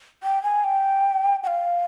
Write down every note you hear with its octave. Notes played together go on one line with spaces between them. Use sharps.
G5
G#5
G5
G5
F5